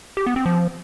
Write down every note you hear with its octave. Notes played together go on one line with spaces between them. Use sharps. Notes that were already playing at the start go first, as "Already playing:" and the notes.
G4
B3
C4
F3